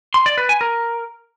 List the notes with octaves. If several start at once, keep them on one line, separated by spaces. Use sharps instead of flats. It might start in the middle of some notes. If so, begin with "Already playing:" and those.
C6
D5
B4
G#5
A#4